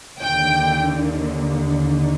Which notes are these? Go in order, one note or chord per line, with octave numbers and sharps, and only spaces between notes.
D#2 D3 G5